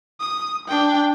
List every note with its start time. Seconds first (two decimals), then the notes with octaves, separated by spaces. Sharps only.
0.20 D#6
0.68 D4 G5